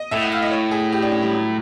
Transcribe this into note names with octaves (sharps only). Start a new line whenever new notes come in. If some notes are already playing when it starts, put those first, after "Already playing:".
Already playing: D#5
A2 E5
F#5
F5
D#5
C#5
G#4
G4
D4
C#4
G3
F#3